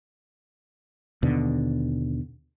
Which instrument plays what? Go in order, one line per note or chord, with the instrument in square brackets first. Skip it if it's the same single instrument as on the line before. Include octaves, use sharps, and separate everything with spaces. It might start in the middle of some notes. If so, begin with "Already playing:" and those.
[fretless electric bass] D#2 B2 D3